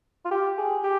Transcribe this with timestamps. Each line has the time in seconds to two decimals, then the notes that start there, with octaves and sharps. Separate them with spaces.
0.25 F4
0.31 G4
0.58 G#4
0.84 G4